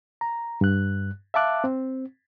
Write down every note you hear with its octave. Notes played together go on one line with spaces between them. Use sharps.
A#5
G2 F#6
E5 F5 A5 D6 F#6
C4